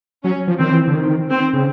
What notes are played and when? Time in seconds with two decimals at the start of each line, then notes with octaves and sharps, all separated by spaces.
0.23 F#3 C#4
0.47 F3
0.59 D#3 C4
0.71 E3
0.88 D3
0.95 D#3
1.30 C4
1.53 C#3